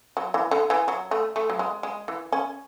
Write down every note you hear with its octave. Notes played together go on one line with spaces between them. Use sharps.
F#3
E3
D3
E3
F#3
A3
A3
F#3
G#3
G#3
E3
C#4